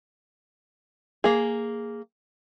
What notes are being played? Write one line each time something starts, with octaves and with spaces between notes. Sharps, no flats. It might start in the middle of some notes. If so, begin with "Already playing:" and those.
A#3 G#4